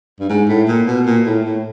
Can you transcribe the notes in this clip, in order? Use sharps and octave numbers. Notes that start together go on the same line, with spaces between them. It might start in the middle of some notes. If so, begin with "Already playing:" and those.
G2
G#2
A2
A#2
B2
A#2
A2
A2